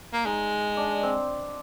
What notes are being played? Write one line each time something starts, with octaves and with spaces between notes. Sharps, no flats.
A#3
G#3 D#4
D4
C4